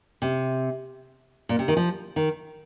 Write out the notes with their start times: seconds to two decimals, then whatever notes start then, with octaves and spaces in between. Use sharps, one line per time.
0.22 C3
1.49 A#2
1.59 C3
1.68 D#3
1.77 F3
2.16 D#3